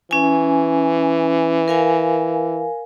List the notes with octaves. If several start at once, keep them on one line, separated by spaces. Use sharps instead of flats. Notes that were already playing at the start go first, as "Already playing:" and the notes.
E3 C#4 G#5
A#4 F5 G#5